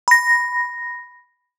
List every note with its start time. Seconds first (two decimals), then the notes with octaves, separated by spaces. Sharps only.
0.08 B5 A#6